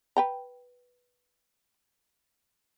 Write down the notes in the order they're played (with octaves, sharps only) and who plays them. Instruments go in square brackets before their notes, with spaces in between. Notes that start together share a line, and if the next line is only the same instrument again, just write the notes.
[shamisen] B4 G5 A#5